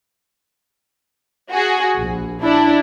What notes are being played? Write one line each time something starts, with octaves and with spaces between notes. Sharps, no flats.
F#4 G#4
A#1
D4 E4